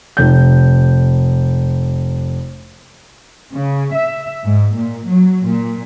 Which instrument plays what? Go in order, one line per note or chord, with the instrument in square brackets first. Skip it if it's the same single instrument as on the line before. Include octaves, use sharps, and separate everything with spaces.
[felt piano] F1 G6
[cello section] C#3
E5
G#2
A#2
F#3
A#2